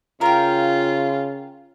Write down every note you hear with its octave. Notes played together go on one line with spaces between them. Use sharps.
C#3 F4 A#4 G5